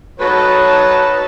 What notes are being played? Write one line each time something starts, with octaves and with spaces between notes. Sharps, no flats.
D#4 F#4 A4 B4 C#5 A5